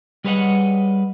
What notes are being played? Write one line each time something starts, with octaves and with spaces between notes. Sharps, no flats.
G3 G#4 B4 C#5 D#5 F#5